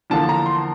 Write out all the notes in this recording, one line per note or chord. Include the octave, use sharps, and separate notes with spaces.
E2 D3 F3 A#3 A5
A#5
C6